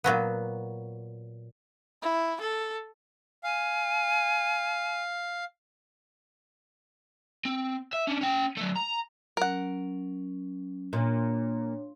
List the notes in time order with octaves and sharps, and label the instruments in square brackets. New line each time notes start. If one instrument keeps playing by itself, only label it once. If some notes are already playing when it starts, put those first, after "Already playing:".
[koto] A#2 F#3 B3
[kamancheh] E4
A4
[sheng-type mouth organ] F5 [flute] G#5
[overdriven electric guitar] C4
E5
C#4 D4
C#4 G5
F#3 A3
A#5
[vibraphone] F#3 C#4 [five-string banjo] A#4 F#5
[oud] A#2 [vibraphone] D4 C#5